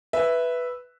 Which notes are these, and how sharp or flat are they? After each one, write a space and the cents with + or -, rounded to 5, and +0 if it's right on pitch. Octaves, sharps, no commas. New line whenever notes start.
B4 +0 E5 +0